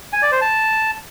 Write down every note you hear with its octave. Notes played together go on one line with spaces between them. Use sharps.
G#5
D5
C5
A5